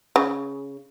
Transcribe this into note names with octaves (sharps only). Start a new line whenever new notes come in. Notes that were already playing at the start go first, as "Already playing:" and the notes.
C#3